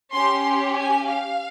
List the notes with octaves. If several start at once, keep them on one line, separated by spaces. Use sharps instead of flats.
C#4 G4 C6
C6
G#5
F5